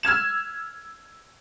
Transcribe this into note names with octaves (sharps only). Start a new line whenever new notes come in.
E6 F6 G#6 E7